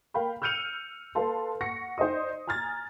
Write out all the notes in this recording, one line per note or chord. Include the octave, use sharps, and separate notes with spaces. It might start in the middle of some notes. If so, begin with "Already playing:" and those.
A#4 F5 G5 B5
E6 F6 G6 C#7 D#7 F7
A4 B4 F5 A5 C6
F#5 C#6 A#6 C#7
D#4 C5 D5 D#5 D#6
G#5 A#5 F6 G#6 A6